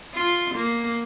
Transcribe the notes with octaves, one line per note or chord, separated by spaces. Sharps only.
F4
A#3